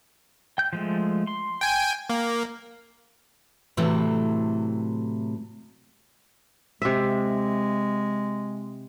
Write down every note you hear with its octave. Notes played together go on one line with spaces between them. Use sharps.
G5 G6
F3 G#3 A3
C6
G5 G#5
A#3
A2 C3 E3 F#3 A3
C3 G#3 E5